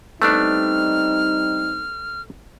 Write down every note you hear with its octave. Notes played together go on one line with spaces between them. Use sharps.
G3 A3 B3 C4 D4 D#4 F6